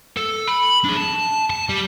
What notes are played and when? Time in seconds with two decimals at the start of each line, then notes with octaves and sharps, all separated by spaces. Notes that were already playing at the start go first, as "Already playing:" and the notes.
0.17 A4
0.48 B5
0.85 D4 G#4
0.97 A5
1.50 A5
1.69 G3